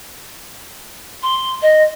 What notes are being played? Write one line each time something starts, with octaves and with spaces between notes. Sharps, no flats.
C6
D#5